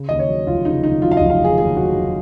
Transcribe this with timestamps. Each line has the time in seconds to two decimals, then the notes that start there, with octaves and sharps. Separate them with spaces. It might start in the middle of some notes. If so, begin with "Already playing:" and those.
Already playing: C#3
0.09 D#2 D#5
0.19 C#5
0.29 F#3
0.47 F1 F4
0.65 C#3 D#4
0.83 D#2 D#4
1.02 F#3 F4
1.11 F5
1.17 D#5
1.21 F1
1.30 F5
1.39 C#3
1.44 G#4
1.58 D#2 G#4
1.76 F#3 F#4
1.94 F1